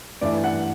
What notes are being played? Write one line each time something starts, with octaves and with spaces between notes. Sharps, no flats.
G2 E3 A3 D4 D5
F#5